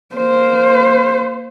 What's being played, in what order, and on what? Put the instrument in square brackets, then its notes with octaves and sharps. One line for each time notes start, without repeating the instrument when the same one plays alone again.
[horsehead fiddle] A#3 C5